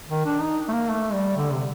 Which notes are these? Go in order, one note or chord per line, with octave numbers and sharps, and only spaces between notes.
D#3
D4
D#4
A3
A#3
A3
G3
D3
C3